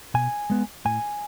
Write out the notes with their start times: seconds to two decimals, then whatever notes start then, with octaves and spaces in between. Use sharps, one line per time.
0.14 B2 G#5
0.50 G#3 B3
0.85 A2 G#5